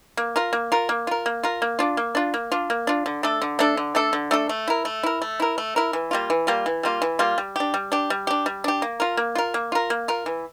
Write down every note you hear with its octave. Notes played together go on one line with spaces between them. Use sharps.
A#3
F4 A#4
A#3
F4 A#4
A#3
F4 A#4
A#3
F4 A#4
A#3
D4 F4
A#3
D4 F4
A#3
D4 F4
A#3
D4 F4
D3
A3 D4 A4
D3
A3 D4 A4
D3
A3 D4 A4
D3
A3 D4 A4
A3
E4 A#4
A3
E4 A#4
A3
E4 A#4
A3
E4 A#4
E3
G3 A#3 F4
E3
G3 A#3 F4
E3
G3 A#3 F4
E3
G3 A#3 F4
G3
D4 G4
G3
D4 G4
G3
D4 G4
G3
D4 G4
A#3
F4 A#4
A#3
F4 A#4
A#3
F4 A#4
A#3
F4 A#4
E3